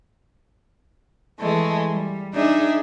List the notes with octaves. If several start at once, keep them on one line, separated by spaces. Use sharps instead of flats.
E3 G#3 A3
G3
D4 D#4 G#4 E5